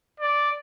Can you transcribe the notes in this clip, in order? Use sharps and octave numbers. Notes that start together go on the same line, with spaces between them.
D5